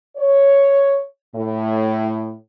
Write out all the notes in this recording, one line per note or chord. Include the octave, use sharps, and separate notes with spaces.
C#5
A2